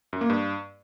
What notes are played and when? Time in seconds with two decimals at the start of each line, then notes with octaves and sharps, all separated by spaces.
0.13 F#2
0.21 A#3
0.30 G2